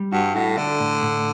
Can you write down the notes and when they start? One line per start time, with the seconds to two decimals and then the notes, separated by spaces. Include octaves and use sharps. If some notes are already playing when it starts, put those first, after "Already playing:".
Already playing: G3
0.12 G2 F#4
0.35 A2 F#4
0.57 D3 D4
0.80 A2
1.02 A2